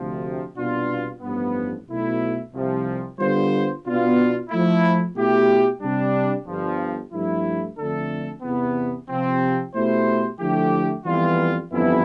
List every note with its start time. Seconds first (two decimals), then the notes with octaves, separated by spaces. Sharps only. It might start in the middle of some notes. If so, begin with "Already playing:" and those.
Already playing: D2 C3 F3
0.56 C2 B2 B3 D4 F4
1.21 A1 G2 F3 B3
1.87 B1 B2 A3 E4
2.53 C2 C3 F3
3.18 D3 G3 B3 F4 C5
3.85 B2 B3 D4 F4
4.50 F3 A3 E4
5.15 B2 A3 E4 G4
5.81 C3 G3 D4
6.46 G1 G2 F3
7.12 G2 F3 A3 E4
7.78 F2 D3 A3 D4 A4
8.43 E2 C3 E3 B3
9.08 C3 F3 C4
9.74 B2 A3 E4 G4 C5
10.39 D3 F3 A3 E4 G4
11.05 F2 E3 G3 B3 F4
11.71 G1 F2 E3 B3 E4